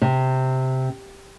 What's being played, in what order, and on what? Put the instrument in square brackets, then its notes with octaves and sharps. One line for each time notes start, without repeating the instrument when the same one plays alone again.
[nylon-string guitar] C3